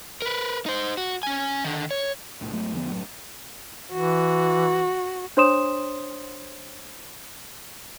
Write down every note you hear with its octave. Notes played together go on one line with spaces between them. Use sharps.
A#4 B4
D#4 C5
F#4
C#4 G#5
D3 D#3
C#5
C2 A2
G#2 F#3 A3
E2 D3 F3 B3
F#2 A2 F#3
E3 F#4
D4 C5 C#5 C6 D#6 E7